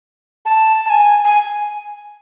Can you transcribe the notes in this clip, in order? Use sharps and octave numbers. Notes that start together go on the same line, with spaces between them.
A5
A5
G#5
G#5